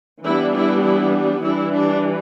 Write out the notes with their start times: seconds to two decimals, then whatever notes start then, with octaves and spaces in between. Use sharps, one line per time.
0.24 E3 G3 B3 D4 E4
0.55 E4
0.83 E4
1.42 E3 G3 D4 E4
1.71 D4